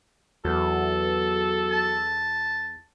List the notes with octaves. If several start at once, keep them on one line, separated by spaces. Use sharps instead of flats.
E2 F#3 A4
A5